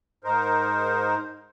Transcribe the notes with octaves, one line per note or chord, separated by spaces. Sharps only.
G#2 D#4 A#4 C5